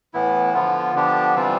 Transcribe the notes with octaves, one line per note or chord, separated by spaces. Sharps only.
A2 E3 B3 E4
D3 F3 B3 F4
D3 F3 B3 D4 G4
C3 E3 G3 C4 F4